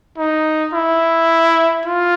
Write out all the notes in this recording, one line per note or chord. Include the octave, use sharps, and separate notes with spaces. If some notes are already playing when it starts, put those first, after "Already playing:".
D#4
E4
F4